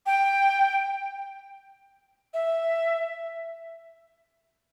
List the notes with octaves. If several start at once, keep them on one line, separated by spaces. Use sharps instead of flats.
G5
E5